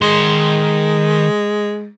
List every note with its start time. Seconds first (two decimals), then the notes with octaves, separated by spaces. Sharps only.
0.02 D#3 G#3 C6